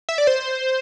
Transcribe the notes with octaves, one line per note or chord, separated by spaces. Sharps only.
E5
D5
C5